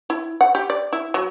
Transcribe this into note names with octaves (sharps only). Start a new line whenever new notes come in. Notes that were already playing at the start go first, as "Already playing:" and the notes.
E4
F#5
G4
D5
E4
F#3